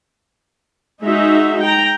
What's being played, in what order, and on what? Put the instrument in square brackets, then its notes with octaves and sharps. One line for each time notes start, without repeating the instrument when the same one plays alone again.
[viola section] G#3 D#4 F#4 E5
G5 A#5